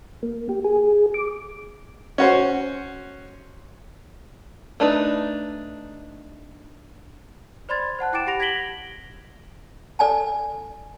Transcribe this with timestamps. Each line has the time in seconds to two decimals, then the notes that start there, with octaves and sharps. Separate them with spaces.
0.23 A#3
0.49 G4
0.65 G#4
1.14 D6
2.18 C#4 F#4 C5
4.80 A3 D4 D#4 B4
7.69 C5 D5 B5 C6 G#6 A6
7.99 C5 F#5 A5 F#6
8.13 E4 G5 D6 A6 D7 E7
8.27 G4 F#5 B5 A#6 D7 F7
8.40 G#6 A#6 B6 D7 F#7 G7
9.99 A4 D5 G#5 A5